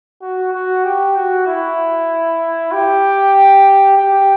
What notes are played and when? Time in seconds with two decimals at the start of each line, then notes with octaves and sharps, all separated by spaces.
0.21 F#4
0.53 F#4
0.84 G4
1.16 F#4
1.47 E4
2.72 G4
3.98 G4